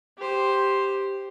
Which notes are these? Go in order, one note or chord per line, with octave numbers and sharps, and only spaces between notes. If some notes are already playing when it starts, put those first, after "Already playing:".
G4 C5